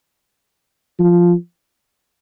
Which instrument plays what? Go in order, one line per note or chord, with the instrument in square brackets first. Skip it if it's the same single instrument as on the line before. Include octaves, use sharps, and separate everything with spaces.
[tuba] F3